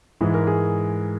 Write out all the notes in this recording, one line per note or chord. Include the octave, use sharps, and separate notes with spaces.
G#2 E3 G#3 G#4
A#4
G#4